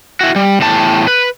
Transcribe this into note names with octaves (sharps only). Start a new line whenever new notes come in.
E4 F#4
G3
E2 A2 G4 A5
B4